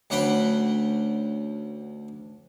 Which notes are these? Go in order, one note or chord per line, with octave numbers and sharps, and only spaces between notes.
D2 C#4 F#5 G5 B5 C6